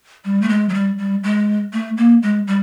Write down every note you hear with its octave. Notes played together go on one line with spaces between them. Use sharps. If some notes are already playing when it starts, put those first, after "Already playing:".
G3
A3
G#3
F#3
G3
G3
G#3
A3
A#3
G#3
G3